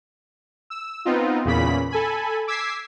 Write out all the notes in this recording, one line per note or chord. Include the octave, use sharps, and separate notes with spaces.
E6
B3 C4 D#4 F4
E2 A#2 C#3 B5 B6
A4 G#5 B5
D6 E6 G#6 B6 C7